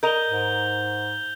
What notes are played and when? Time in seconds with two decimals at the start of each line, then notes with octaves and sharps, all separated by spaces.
0.03 A#4 D#5 G6 F7 G7
0.29 G#2